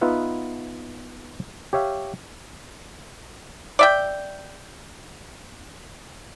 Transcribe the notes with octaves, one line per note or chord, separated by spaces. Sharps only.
B3 D#4 F4 B4 E5 F#5
G4 C#5 E5 F5
D5 E5 G5